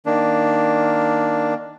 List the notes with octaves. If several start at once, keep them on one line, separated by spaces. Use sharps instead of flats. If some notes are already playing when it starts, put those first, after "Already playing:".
D#3 A#3 D4